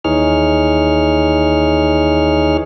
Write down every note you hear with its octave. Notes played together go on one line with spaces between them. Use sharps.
D#2 E3 D#4 G#4 C#5 F6